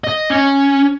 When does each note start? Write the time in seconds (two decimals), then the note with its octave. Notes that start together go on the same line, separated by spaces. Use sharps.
0.04 D#5
0.30 C#4